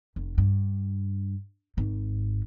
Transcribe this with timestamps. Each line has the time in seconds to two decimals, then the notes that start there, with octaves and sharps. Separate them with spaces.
0.16 F1
0.38 G2
1.77 G#1 G#2